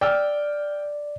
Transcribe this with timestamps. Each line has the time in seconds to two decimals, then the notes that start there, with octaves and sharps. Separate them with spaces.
0.01 D5 G5 E6 F6